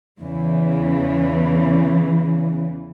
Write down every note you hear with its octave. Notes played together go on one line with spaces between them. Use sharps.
E2 C#3 E3